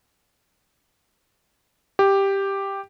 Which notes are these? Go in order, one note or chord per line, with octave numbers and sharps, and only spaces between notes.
G4